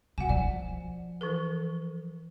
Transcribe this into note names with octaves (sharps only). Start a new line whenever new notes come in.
B2 F#5 G#5
F3 D5
E3 A4 A#4